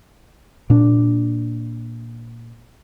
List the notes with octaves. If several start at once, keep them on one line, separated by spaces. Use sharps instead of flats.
A#2 D4